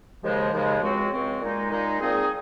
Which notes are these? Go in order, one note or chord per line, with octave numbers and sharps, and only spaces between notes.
D#2 C#3 F3 G#3
D#2 C#3 F3 G#3
C#2 C#3 G#3 C4 F#4
C#2 C#3 G#3 C4 F#4
A#2 G#3 D#4
A#2 G#3 D#4
A#2 F3 C4 D#4 G#4